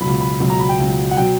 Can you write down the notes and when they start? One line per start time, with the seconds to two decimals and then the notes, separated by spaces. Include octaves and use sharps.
0.01 C#2 B2 F#3 B5
0.20 B5
0.40 C#2 B2 F#3
0.50 A#5
0.59 B5
0.69 G5
0.79 C#2 B2 F#3
1.11 F#5
1.17 B2 F#3 G5